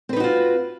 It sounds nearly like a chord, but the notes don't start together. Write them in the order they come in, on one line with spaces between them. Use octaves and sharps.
C4 B4 D#4 F#4 F4